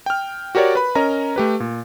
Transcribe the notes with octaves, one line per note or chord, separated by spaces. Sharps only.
G5 F6
F#4 G4 A#4 C#5 D5
B4 B5
C#4 A#4 D#5 A#5
A3 G4 B4
A#2